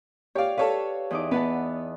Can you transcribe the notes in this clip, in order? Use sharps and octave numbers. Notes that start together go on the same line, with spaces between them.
G4 C#5 D5 F5
A4 B4 C#5 F5
E2 D#4 D6
B3 B4 F#5 A5